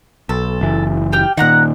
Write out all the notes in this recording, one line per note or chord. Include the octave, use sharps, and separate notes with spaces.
B1 A4
F#1 E3
G4 G5 F6
A#2 D#3 F#5 A#5 F#6